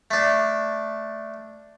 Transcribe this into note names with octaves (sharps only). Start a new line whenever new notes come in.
A3 D4